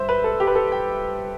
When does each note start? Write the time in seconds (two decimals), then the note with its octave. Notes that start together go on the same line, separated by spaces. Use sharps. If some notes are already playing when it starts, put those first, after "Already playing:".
Already playing: G2 C5 E5
0.09 B4
0.24 A4
0.40 G4
0.47 B4
0.55 A4
0.72 G5